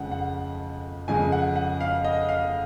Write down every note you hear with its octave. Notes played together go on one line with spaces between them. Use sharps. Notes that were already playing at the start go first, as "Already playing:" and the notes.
Already playing: F2 C#3 F3 G#3 F#5
F#5
F2 C#3 G#3 G#5
F#5
F#5
F5
D#5
F5